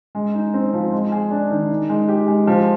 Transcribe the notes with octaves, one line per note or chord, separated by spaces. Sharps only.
G#3
D#4
C4
F3
G#3
G#4
D4
D#3
D#4
G#3
G4
G#3
F3